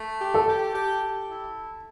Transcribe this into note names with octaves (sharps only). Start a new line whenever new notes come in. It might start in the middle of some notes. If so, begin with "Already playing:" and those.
Already playing: A3
G4
A4
G4
G4
G4
E4